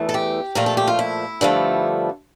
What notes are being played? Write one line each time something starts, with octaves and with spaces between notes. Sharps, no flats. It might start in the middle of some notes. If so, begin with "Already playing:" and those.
Already playing: E2 E3 A3
A4
G4
A#2 F3 A3 A#4
A4
G4
F4
E4
G2 D3 F3 A3